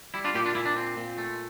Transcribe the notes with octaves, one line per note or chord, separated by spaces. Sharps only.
G3 E4
D4 F4
A#2 E4 G4
D4 F4
A#2 E4
D4
C4
A#2
A3